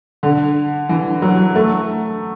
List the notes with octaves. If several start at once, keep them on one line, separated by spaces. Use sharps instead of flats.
D3
E3
F#3
A3